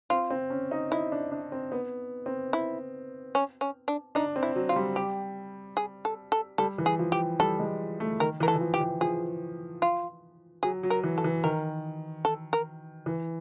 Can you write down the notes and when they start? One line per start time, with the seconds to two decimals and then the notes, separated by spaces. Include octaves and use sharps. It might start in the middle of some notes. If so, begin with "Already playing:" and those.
0.10 C4 F4
0.30 C4
0.50 C#4
0.71 D#4
0.91 D#4 E4
1.12 D4
1.32 D4
1.52 C4
1.72 B3
2.26 C4
2.53 E4
3.35 C#4
3.61 C#4
3.88 D4
4.15 D4 D#4
4.36 C4
4.43 E4
4.56 F#3
4.69 F4
4.76 G3
4.96 G4
5.77 G#4
6.05 A4
6.32 A4
6.58 G3 A4
6.78 E3
6.86 G#4
6.99 F3
7.12 G4
7.39 G3 A4
7.59 G#3
8.00 A3
8.20 D#3 A#4
8.40 E3 A#4
8.48 A4
8.56 E3
8.61 F3
8.74 G4
8.81 E3
9.01 F3 G#4
9.82 F4
10.63 F#3 G#4
10.83 F#3
10.90 A#4
11.03 E3
11.18 A4
11.24 E3
11.44 D#3 A#4
12.25 A4
12.53 A#4
13.06 E3